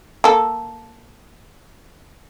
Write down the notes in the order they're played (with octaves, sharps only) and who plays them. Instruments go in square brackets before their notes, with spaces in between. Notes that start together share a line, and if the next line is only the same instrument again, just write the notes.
[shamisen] A#3 A4